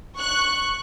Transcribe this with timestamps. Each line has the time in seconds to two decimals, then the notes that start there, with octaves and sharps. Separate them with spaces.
0.16 C#6 F#6